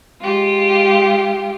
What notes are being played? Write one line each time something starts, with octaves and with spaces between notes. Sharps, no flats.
G#3 F4 G4